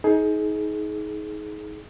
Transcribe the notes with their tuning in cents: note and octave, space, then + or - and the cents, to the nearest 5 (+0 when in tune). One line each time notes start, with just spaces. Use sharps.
D#4 +25 G#4 +25